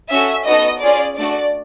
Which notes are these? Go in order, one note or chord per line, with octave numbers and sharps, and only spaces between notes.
C#4 F#4 A4 E5
B3 D#4 F#4 A4 D#5
C#4 F4 G#4 D5
A3 D4 F#4 D5